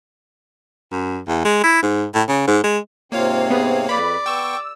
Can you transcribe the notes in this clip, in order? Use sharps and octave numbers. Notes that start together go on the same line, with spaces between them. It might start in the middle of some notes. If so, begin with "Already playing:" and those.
F#2
E2
G#3
E4
G#2
A2
C#3
G#2
G#3
G#2 C3 A#3 C4 F4 C#5 F5
B3 G#4
F2 B4 D5 B5
B3 G5 C#6 E6